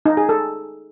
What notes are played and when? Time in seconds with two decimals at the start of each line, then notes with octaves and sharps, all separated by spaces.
0.06 D#4
0.17 G#4
0.29 A4